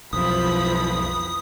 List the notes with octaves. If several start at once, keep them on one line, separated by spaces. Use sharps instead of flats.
B1 F2 E3 F3 B5 D#6